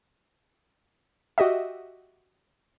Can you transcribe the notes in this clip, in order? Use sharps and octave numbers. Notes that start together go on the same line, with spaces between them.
F#4 G4 D#5 E5